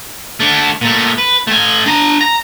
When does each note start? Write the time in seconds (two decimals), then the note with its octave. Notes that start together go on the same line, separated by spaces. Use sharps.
0.40 A3 D4
0.81 A#2 A3
1.18 B4
1.47 A3 G#5
1.86 D4 A#5
2.21 A#5